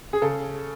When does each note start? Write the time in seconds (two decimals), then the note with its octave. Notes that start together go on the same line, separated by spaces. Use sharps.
0.13 G#4
0.22 C#3 A4